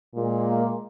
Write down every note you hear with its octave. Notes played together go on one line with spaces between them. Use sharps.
A#2 G#3
A#3